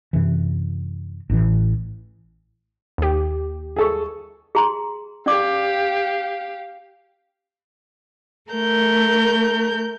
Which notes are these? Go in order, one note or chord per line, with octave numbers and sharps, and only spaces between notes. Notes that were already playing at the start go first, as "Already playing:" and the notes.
F#2 C3 E3
A1 A2 E3
D#2 G4
G#4 A4 C#6
G#4 A#5 C6
C#4 G4 D5 F5 D6
A3 A#4 G6